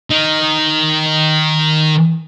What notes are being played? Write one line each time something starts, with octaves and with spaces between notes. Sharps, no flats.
D#3 D#4